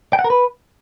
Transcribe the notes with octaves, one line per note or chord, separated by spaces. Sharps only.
G5
F#5
A#4
B4